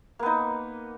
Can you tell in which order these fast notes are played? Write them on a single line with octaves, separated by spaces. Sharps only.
A#3 B3 D#4